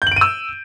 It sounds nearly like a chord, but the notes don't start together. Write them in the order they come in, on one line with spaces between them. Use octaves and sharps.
G6 F#7 D7 D#7 E6